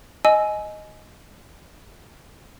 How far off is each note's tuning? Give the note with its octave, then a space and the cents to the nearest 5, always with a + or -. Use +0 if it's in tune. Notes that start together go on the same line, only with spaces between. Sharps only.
D#5 +0 G#5 +20 E6 +0